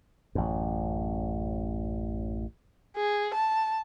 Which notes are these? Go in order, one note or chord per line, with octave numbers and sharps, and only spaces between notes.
A1 F#2
G#4
A5